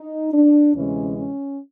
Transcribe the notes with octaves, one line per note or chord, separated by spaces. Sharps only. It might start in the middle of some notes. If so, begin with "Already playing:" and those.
Already playing: D#4
D4
D2 C3 E3 G#3 C#4
C#4